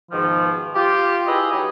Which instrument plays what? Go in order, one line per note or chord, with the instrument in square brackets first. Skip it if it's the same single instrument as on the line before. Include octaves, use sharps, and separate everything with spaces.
[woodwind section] G#2 B2 D#3 F3
F4 G4
E4 G4 G#4 B4 D#5 E5
F#3 D#4 G4